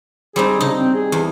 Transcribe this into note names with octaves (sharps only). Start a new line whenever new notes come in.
G3 C4 D#4 G#4
C#3 D#4
C4
G#4
E2